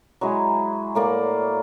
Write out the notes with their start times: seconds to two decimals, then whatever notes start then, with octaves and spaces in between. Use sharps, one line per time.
0.21 F#3 G#3 E4 G#5
0.95 A2 A#3 D5